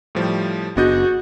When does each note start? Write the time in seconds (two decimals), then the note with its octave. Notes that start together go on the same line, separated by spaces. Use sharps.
0.15 A2 F3 G3
0.77 F#1 B3 D4 F#4 G#4 D#5 G6